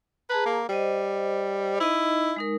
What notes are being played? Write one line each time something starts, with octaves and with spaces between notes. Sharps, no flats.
G#4 B4 A5 A#5
A#3
G3 C5 D#5
D#4 E4 D#5
G#3 D#4 A#4